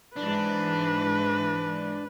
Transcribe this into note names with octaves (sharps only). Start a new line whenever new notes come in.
G#2 E3 D4 B4